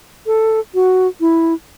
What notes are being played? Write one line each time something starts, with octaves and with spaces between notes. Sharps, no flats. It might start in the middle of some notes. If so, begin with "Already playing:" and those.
A4
F#4
E4